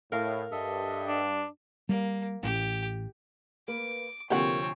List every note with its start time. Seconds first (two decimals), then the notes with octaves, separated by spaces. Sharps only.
0.12 A2 A#4 F5
0.51 G2 A4 D#5 E5
1.08 D4
1.89 G3 A#3
2.43 A1 G4
3.68 A#3 B4 D6
4.30 D2 C3 F3 A#3 C4 G4 C#5 F#5